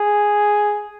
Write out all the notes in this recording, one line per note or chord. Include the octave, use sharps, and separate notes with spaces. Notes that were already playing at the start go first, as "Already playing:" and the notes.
Already playing: G#4